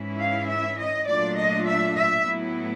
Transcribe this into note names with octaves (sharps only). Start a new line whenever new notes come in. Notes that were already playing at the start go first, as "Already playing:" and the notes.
Already playing: G#2 E3 G#3 C#4 E4
F5
E5
D#5
A#2 F#3 A3 D4 F4 D5
D#5
E5
E5
A2 F#3 B3 E4